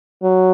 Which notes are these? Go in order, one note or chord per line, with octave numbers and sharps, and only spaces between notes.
F#3